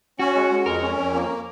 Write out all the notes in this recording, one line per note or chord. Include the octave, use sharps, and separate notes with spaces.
C#4 F#4
G#3
G#3
F2 A#4
C#4
F2
A#3